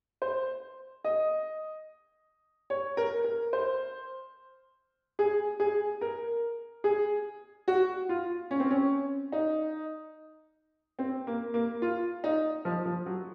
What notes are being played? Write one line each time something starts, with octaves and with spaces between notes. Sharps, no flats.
C5
D#5
C#5
A#4
A#4
C5
G#4
G#4
A#4
G#4
F#4
F4
C#4
C4
C#4
D#4
C4
A#3
A#3
F4
D#4
F3
F3
F#3